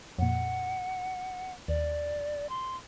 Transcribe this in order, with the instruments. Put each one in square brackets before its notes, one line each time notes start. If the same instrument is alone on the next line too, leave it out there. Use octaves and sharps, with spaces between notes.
[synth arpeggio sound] F2 A#2 [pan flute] F#5
[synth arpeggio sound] D#2 [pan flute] D5
[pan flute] C6